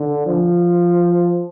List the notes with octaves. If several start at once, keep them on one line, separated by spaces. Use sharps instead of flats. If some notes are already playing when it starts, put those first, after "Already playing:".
Already playing: D3
F3